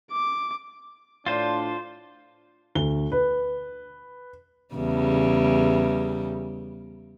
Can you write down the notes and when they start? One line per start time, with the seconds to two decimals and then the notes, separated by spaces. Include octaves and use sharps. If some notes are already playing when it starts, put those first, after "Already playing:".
0.11 D6
1.26 A2 D4 F4 C5
2.75 D2 G7
3.12 B4
4.74 E2 C#3 G3